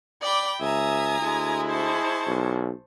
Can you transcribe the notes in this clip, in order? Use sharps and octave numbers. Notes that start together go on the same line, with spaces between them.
D5 G5 B5 D6
C#2 E5 G#5 A#5 D#6
D2 G#3 E4
C5 A5 C#6
B1